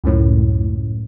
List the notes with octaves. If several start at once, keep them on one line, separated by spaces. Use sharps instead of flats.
C#2 F#2 A2